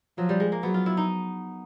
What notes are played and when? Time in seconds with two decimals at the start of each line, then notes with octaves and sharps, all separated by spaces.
0.18 F3 F#3
0.29 G3
0.40 G#3
0.52 A#3
0.63 F#3 B3
0.74 F4
0.86 E4
0.97 D#4